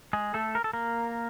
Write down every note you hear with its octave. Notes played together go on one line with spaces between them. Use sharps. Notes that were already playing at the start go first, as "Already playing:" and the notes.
G#3 G#4
A3 A4
A#4
A4
A#3 A#4